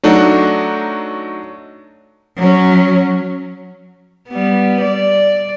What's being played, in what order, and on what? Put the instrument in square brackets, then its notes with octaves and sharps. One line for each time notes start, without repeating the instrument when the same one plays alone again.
[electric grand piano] F#3 A3 D4 D#4 F#4
[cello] F#3 C#4
[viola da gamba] G3 B3
D5